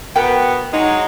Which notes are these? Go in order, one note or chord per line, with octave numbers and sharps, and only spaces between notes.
B2 B3 A#4 G5
F#3 G#3 D#4